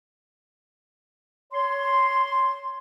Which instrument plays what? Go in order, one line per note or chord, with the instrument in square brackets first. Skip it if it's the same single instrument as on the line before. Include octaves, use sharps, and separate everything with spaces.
[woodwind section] C#5 C6